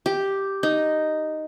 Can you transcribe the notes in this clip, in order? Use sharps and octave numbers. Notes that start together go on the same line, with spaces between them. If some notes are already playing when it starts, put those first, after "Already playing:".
G4
D#4